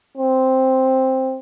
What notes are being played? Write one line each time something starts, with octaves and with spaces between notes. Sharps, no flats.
C4